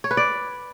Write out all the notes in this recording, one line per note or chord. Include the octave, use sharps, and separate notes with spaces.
C#5
B4
D5